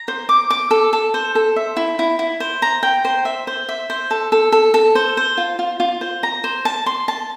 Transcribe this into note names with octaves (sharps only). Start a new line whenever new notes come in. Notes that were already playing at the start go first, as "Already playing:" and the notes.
Already playing: A#5
C5
D6
D6
A4
A4
C5
A4
E5
E4
E4
E4
C5
A#5
G5
C5
E5
C5
E5
C5
A4
A4
A4
A4
C5
C5
F4
F4
F4
C5
A#5
C5
A5
C6
A5